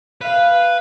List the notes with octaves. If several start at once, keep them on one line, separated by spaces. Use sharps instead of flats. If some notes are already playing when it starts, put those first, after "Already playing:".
B4 F5